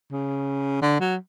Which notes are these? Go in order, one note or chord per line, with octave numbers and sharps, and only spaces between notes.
C#3
D3
F#3